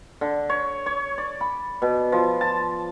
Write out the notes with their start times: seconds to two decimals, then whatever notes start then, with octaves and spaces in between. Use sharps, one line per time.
0.21 D3
0.50 C#5
0.86 C#5
1.18 D5
1.41 B5
1.82 B2
2.12 F3
2.41 A5